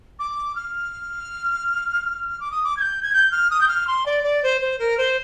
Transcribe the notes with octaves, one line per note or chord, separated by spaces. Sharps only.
D6
F6
D6
D#6
D6
G#6
G6
G#6
G6
F6
D#6
G6
F6
C6
D5
D5
C5
C5
A#4
C5